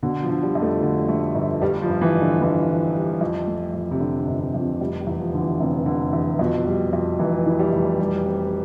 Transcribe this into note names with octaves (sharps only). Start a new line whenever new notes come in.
B2 D3
F3
D3
G3
F2
A3
D3
A3
G1
G2 G3
F3
G2
E3
A1
D3
A1 E3
A1
G3
F2
A3
F2
C3
F2 D3
D3
G1
C3
F2
C3
F1 G3
G3
E2
F3
D3
E3
F1 C3
D3
E2
F2 B2
G3
F2
F1 E3
E3
G3
F1
G3
C4